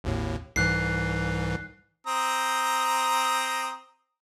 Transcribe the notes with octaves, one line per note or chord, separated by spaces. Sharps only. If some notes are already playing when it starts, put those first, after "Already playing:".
G#1 D#2 A2
C2 G#2 E3 F#6 C7
C4 A#5 D#6